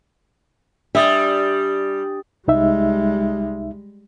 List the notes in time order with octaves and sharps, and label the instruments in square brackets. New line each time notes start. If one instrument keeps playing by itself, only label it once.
[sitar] G3 [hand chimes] D4 D#6 A6 [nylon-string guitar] E5
[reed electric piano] C2 D#4 E5 [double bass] G3 G#3